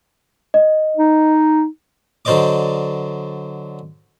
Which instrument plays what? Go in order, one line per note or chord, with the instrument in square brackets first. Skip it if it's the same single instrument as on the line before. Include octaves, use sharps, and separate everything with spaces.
[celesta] D#5
[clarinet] D#4
[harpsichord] D3 F#3 C5 D5 D#5 D6